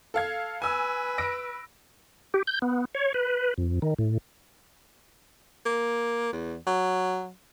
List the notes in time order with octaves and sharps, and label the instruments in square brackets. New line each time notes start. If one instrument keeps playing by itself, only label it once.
[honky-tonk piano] A4 F5 G#6
[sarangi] B4 [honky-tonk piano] G#5 E6
[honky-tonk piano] E6 A#6 D7
[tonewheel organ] G4
G6
B3
C#5
B4
F2
D#3
A2
[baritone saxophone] A#3
E2
F#3